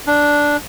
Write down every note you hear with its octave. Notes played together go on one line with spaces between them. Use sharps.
D4